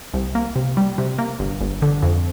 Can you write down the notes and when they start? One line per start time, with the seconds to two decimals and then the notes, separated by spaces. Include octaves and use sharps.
0.14 C2
0.35 A#3
0.56 C3
0.77 G3
0.98 C3
1.18 A#3
1.39 G1
1.61 G1
1.82 D3
2.02 F2